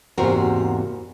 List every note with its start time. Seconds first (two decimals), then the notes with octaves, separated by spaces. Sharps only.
0.17 E2 G#2 C3 A#3 F#4 A#4